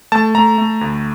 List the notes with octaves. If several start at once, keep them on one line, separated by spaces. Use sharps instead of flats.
A3 A5
A3 A#5
A3
D2